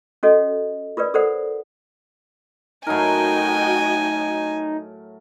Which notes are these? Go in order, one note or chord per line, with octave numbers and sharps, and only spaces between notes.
C#4 F#4 A4 C#5 D#5
F4 A#4 B4 D5
A4 A#4 C5 D5 F#5
A2 F#3 D#4 F#4 A#4 D#5 G5 G#5